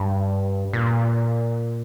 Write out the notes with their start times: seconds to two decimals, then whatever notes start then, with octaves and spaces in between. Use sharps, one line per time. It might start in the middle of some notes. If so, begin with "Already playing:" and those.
Already playing: G2
0.73 A#2